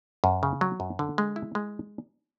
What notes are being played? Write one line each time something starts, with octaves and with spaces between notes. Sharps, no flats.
F#2
C#3
F#3
F#2
D3
G#3
E4
G#3